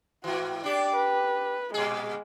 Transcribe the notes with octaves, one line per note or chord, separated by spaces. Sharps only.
G#2 E3 F#4
D4 G4 D5 D6
B4
A#2 G#3 G#4